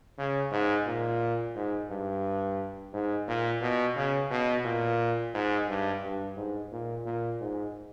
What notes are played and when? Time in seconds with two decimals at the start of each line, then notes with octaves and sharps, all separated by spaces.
0.18 C#3
0.51 G#2
0.86 A#2
1.55 G#2
1.90 G2
2.93 G#2
3.27 A#2
3.62 B2
3.96 C#3
4.30 B2
4.64 A#2
5.34 G#2
5.68 G2
6.03 G2
6.36 G#2
6.72 A#2
7.05 A#2
7.40 G#2